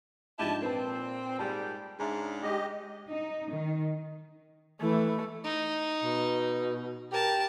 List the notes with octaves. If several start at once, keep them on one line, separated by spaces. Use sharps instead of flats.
G#2 F3 D4 E4 G4 D#5 A5
A#2 C4 B4 A5
G#2 G3 D5 A5
G#2 C#3 D4 E5 A#5
G#3 G4 D#5
D#4
D#3
E3 A3
D#4
B2
G4 A#4 A5